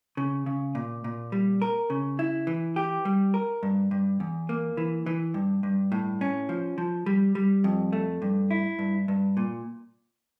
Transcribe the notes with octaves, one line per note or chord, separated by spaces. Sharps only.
C#3
C#3
A#2
A#2
G3
A#4
C#3
E4
E3
G4
G3
A#4
G2
G2
E2
A#3
E3
E3
G2
G2
A2
C#4
F3
F3
G3
G3
F2
A3
G2
E4
G2
G2
A#2